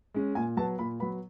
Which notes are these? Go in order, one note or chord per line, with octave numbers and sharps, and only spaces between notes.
G#3 C#4
A#2 G#5
F#3 B3 A5
A#2 B5
F#3 B3 B5